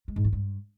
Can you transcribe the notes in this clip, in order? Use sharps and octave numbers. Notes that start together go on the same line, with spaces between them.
G#3
G#2
E3
G2